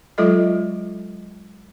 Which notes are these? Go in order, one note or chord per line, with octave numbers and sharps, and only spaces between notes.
F#3 G#3 F4 A4 D#5